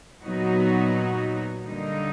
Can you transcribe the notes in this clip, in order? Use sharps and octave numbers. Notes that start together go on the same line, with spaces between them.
A#2 F#3 B3 D#4 F#4
D3 G3 A#3 D#4